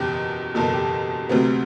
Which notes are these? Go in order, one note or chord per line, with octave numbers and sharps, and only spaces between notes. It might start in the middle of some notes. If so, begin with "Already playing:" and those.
Already playing: F#1 E2 B2 G4
F#1 E2 B2 A4
G4
D2 C3 F#3 B3 C4